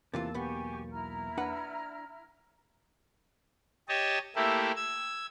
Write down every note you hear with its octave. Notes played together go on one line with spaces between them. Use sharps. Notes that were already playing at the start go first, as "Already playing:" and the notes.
E2 C3 E3 A#3 F4 A5 E6 A6
B1 B3 G4 G#5 C#6
E4 A#5 F6
D4 B4 F#5
G4 C#5 D#5 A5
A3 A#3 E4 G4
E6 G#6